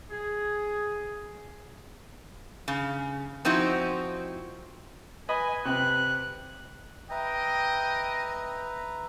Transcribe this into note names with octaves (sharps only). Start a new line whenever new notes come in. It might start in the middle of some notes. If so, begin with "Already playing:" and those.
G#4
C#3
F3 C4 D#4 E4 F#4
B4 D#5 G#5 B5
C3 G4 B4 F#6
B4 D#5 E5 G5 A#5